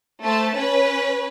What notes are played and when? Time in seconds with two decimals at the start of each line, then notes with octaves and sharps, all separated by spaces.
0.24 A3 C5 A5
0.53 C#4 B4